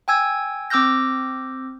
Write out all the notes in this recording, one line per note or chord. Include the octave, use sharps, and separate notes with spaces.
G5 G#5 E6 G#6
C4 D6 E6 F6 G6 A#6